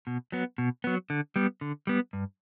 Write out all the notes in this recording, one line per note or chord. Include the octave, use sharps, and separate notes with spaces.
B2
F#3 B3
B2
F#3 B3
D3
G3 B3
D3
G3 B3
G2